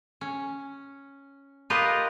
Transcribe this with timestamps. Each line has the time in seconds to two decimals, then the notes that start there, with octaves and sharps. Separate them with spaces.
0.21 C#4
1.70 F4 G4 A#4 B4 D#5